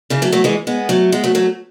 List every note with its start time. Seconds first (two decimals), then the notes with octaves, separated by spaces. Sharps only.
0.10 C#3 E3
0.22 F#3 A3
0.32 F#3 A3
0.44 E3 G#3
0.67 G#3 B3
0.89 F#3 A3
1.12 G#3 B3
1.24 F#3 A3
1.35 F#3 A3